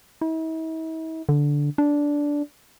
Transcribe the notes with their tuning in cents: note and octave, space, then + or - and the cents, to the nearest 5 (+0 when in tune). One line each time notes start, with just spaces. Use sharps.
E4 -45
D3 -10
D4 -10